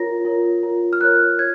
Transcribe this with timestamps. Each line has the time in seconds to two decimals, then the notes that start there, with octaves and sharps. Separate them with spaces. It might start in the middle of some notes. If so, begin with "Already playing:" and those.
Already playing: F4 A#4 C#5 A#6
0.25 F4 A#4 C#5
0.63 F4 A#4 C#5
0.93 F6
1.00 F4 A#4 C#5 F#6
1.39 C#5 G#6